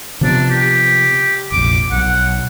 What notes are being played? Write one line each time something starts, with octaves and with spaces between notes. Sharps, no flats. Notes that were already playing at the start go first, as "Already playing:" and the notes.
C3 F3 B3 D4
G4
F1 A#1 D6
B1 F#5